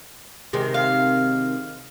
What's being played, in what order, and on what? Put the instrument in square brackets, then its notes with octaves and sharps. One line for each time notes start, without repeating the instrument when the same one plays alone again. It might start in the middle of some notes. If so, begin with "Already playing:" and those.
[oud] C3 D#3 G#3
[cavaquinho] F5